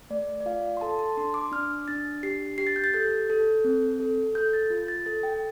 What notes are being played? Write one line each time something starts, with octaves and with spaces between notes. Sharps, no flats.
A3 D5
D5
F4 F5
C6
A4 A5
A5
D4 C6
D6
D4 F6
D4 A6
G4 C7
G4 C7
A6
G6
A6
A4 G6
A4
C4
A4
A4 G6
A6
F4
A6
A4 A6
G5